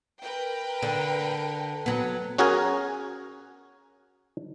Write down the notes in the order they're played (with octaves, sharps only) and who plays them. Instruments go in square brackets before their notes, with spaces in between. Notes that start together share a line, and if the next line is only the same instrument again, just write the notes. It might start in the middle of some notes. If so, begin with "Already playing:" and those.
[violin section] A#4 B4 G5
[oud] D3
F#3 B3
[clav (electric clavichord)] C#4 F#4 G#4 A#4 G#5